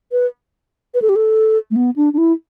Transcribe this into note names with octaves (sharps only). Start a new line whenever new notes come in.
B4
B4
A4
G4
A4
A3
B3
D4
D4
E4